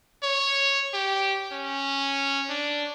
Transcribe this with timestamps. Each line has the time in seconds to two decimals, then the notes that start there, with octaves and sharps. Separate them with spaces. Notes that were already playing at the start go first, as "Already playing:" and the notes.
0.23 C#5
0.94 G4
1.52 C#4
2.50 D4